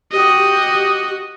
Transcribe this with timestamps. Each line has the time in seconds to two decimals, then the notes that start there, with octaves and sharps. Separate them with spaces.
0.12 F#4 G4 D#5